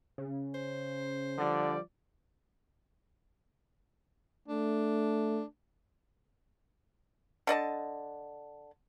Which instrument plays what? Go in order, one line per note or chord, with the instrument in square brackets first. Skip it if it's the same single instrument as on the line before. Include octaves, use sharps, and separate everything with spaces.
[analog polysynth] C#3
[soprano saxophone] C5
[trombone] D3 [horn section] F3 G3 D5
[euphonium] A3 [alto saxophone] D4
[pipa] D3 D5 D#5 A5